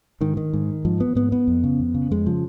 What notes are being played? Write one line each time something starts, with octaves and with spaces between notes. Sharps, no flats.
G#2 D#3
D#3
G#2
G#2 F3
B3
G#2 B3
B3
F2
C#3
F2
C#3
F2 G#3
C#3 F3